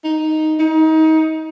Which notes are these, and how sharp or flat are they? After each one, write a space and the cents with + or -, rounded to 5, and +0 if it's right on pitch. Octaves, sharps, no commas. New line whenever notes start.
D#4 +0
D#4 +25